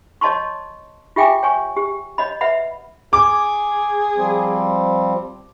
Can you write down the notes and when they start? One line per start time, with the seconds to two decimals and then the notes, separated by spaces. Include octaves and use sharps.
0.21 C#5 D#5 A5 C6 C#6
1.16 F4 G4 E5 G5 G#5 D6
1.43 C#5 G#5 C#6
1.77 G4
2.18 C#5 D#5 B5
2.41 B4 E5 F#5 B5
3.13 G#4 D6
4.16 F3 G3 C4